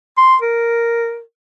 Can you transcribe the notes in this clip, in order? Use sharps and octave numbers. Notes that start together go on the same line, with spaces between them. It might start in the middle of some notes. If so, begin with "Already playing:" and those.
C6
A#4